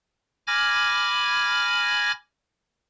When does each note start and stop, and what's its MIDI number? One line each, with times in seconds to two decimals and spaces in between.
0.47 2.12 80
0.47 2.12 83
0.47 2.12 86
0.47 2.12 89
0.47 2.12 92
0.47 2.12 94